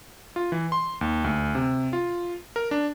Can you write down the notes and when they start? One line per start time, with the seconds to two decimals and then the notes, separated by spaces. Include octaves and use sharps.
0.36 F4
0.52 E3
0.72 C6
1.01 D#2
1.24 D2
1.55 C3
1.93 F4
2.56 A#4
2.71 D4